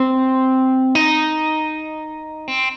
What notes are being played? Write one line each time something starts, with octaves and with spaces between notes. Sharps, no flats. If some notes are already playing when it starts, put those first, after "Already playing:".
Already playing: C4
D#4
C4